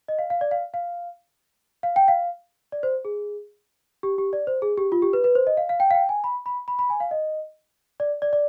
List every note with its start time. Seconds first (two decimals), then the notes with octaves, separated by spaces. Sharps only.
0.08 D#5
0.19 F5
0.30 F5
0.41 D5
0.51 F5
0.74 F5
1.83 F5
1.96 G5
2.08 F5
2.72 D5
2.83 C5
3.05 G#4
4.03 G4
4.18 G4
4.33 D5
4.47 C5
4.62 G#4
4.78 G4
4.92 F4
5.02 G4
5.13 B4
5.24 B4
5.35 C5
5.47 D#5
5.57 F5
5.69 F5
5.80 G5
5.91 F5
5.95 G5
6.09 G#5
6.24 B5
6.46 B5
6.68 B5
6.79 B5
6.90 G#5
7.00 F5
7.11 D#5
8.00 D5
8.22 D5
8.33 D5